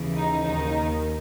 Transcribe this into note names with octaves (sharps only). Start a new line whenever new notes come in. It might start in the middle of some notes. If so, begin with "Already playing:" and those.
Already playing: D#2 C#3 E3
D#4
D#2 D#3 D#4